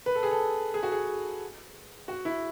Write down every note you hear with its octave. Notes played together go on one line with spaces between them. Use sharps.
B4
A4
G#4
A4
G#4
F#4
G#4
F#4
E4